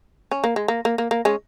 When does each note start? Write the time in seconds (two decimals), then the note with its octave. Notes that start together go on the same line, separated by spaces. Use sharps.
0.31 C#4
0.44 A#3
0.56 G#3
0.68 A#3
0.85 A#3
0.98 A#3
1.11 A#3
1.25 G#3 C#4